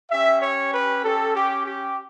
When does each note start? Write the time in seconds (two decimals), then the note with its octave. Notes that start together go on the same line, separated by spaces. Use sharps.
0.11 C#4 G4 E5
0.42 C#5
0.74 B4
1.04 C#4 G4 A4
1.35 G4
1.67 G4